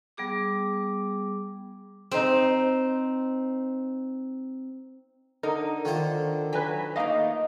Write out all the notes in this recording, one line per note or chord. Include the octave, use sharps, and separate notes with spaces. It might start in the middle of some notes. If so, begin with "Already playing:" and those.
G3 B3 G#4 D6
C4 D#4
D3 D#4 A#4
D3 D#3 F4 C5
F#3 B4 G#5 B6
A3 A#3 D#4 D#5 F5